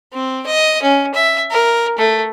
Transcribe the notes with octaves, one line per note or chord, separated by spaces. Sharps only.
C4
D#5
C#4
E5
A#4
A3